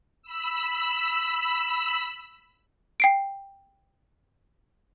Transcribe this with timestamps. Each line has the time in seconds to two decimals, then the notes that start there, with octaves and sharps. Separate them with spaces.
0.22 B5 E6
3.00 G5 C7 D7